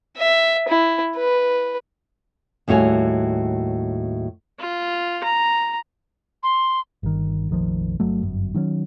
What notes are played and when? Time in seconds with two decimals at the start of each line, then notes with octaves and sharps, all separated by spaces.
0.17 E5
0.69 E4
1.16 B4
2.68 D#2 A2 G3 F#4 C#5 G#5
4.60 F4
5.24 A#5
6.43 C6
7.03 G1 D#3
7.49 F1 A#1 D#3 F3
8.00 G1 F#3 A3
8.23 G1 F#2
8.54 D#3 F#3 G#3 C#4